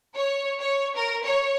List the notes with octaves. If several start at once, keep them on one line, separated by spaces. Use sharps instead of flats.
C#5
C#5
A#4
C#5